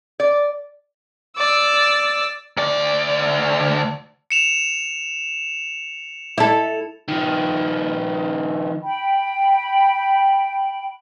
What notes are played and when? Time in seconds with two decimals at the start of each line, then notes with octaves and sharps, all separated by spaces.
0.20 D5
1.37 D5 E6
2.57 D2 D5
4.31 C#7 E7 F7
6.38 E4 A4
7.08 D#3 F3
8.83 G5 B5